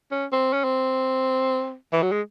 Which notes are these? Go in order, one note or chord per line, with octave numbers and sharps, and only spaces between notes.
C#4
C4
C#4
C4
E3
F#3
G#3